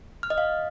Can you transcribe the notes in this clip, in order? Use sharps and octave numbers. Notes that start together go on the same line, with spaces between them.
F6
D#5
F5